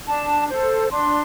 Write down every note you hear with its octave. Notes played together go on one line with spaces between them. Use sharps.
D4 A5
A4 C5
D4 C6